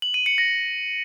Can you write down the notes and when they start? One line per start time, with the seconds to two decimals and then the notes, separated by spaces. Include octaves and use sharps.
0.02 F#7
0.14 D#7
0.26 C#7
0.38 A#6